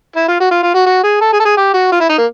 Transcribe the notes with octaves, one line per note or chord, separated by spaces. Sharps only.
E4
F4
F#4
F4
F4
F#4
F#4
G#4
A4
G#4
A4
G#4
G4
F#4
F4
E4
D#4
A#3